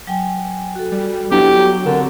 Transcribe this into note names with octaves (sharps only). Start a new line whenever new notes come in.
F#3 G5 G#5
F#4 A4
G3
F#3 B3 D4 E4 G4
D3 C4 A#4